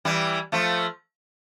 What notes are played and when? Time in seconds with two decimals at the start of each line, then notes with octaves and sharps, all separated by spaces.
0.05 E3 G3
0.52 F3 A3